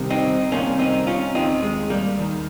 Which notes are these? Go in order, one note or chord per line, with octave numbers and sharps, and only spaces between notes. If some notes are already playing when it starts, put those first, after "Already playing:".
Already playing: C2 C3 D#3
C4 D#4
C2 C3 D#3 A#3 C#4
C4 D#4
C#4 F4
D#2 D#3 C4 D#4
G#3
G3 A#3
D#2 D#3